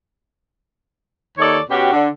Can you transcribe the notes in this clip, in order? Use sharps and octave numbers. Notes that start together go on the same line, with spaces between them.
D#2 D#3 A4 C#5 D5
B2 C#4 F#4 G4
D3